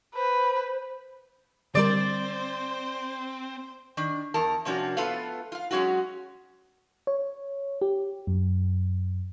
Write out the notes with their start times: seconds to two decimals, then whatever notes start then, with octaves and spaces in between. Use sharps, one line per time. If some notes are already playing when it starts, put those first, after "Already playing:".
0.15 B4 C5
1.75 D3 G3 C4 A#4 C5 D5
3.97 D#3 D4
4.34 E2 A#4 A5
4.65 C3 F3 A#3 C#4 D4 F#4
4.97 A3 B3 F4 A4 B4 F5
5.52 F4 F5
5.71 F#3 G#3 C#4 F4 F#4
7.07 C#5
7.81 G4
8.27 F#2